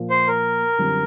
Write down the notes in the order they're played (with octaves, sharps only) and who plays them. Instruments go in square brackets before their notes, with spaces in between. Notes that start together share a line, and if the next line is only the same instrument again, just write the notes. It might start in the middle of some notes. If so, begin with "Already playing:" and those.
Already playing: [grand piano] A#2 F3 A#3
[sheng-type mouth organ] C5
A#4
[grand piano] F#2 D3 G3 C4 F4